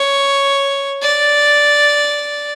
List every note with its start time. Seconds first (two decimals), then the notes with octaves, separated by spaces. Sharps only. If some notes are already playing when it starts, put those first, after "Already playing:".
Already playing: C#5
1.02 D5